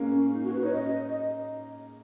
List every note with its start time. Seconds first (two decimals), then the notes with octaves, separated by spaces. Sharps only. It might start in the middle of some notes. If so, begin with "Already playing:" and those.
Already playing: G#3 A#3 C#4
0.33 D#4
0.43 F#4
0.52 B4
0.63 D#4 C#5
0.72 C#4 D#5